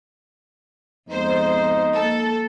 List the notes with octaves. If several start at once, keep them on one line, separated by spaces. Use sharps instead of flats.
F2 G#3 B3 D#4 C5
A#3 A4